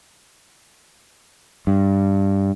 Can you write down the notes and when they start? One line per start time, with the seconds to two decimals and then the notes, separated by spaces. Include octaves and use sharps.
1.67 G2